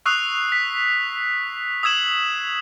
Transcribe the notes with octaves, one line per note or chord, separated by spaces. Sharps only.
C#6 D#6 E6 F#6 C7 F7
B6
D#6 E6 G#6 E7 F#7